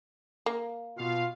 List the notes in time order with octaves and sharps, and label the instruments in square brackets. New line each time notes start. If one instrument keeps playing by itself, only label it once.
[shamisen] A#3
[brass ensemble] B2 F4 F5